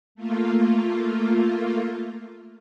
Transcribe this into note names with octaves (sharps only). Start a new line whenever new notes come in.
A3 A#3 F4